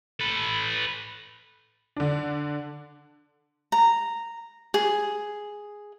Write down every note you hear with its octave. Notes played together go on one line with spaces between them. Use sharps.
A4 B4
D3 D4
A#5
G#4